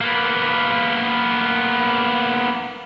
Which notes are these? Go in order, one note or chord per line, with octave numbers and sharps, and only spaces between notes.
A#3 B3